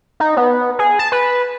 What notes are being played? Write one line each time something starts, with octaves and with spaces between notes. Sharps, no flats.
D#4
B3
G#4
A5
B4